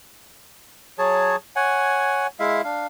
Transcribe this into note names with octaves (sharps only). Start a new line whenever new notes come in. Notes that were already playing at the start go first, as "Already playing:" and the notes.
F#3 G#4 C#5 A5
C#5 F#5 G#5
G#3 E4 E5 F5
D4 F5